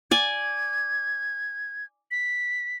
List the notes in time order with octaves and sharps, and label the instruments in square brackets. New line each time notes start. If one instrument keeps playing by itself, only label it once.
[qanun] D5 G#5 [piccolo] G#6
[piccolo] B6